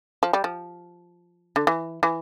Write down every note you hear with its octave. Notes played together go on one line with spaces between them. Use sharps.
F3
G3
F3
D3
E3
E3